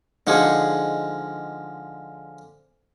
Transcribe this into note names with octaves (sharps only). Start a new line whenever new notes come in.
D3 F3 G#3 D#4 G#4